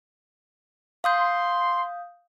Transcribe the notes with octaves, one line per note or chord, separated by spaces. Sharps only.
F5 C6 D#6 G6